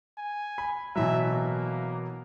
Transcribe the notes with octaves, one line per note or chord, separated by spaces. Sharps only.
G#5
B5
B2 E3 F#3 E5
A#3